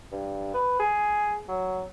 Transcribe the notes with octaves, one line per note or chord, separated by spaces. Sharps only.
G2
B4
G#4
F#3